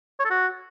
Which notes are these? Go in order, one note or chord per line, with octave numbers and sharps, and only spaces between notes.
C#5
A4
F#4